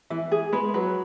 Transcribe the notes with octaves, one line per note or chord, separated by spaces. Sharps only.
E3 E5
G#4
G#3 B4
F#3 B4